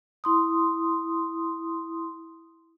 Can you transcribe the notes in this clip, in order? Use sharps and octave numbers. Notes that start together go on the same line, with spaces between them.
E4 C6 D#6